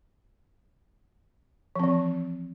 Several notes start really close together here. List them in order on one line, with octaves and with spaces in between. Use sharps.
F3 C4 E3